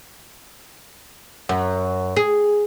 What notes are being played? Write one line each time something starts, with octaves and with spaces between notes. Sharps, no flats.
F#2
G#4